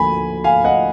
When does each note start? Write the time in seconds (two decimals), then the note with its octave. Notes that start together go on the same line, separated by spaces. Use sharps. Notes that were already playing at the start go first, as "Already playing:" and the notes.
Already playing: D2 D3 F3 A#3 G#5 B5
0.44 F5 G#5
0.64 D#5 F#5